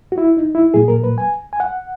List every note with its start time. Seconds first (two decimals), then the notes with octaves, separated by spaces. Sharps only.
0.12 F#4
0.18 E4
0.37 D#4
0.55 E4
0.74 A#2 F#3 A#3 G#4
0.88 A#4
1.04 B4
1.18 G#5
1.53 G#5
1.60 F#5